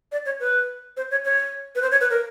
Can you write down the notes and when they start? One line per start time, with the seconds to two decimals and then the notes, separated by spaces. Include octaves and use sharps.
0.12 D5
0.26 C#5
0.40 B4
0.97 C5
1.11 C#5
1.25 C#5
1.75 B4
1.82 C5
1.91 C#5
2.01 B4
2.10 A#4